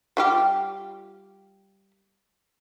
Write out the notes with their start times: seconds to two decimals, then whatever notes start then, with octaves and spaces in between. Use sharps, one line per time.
0.17 G3 F4 G4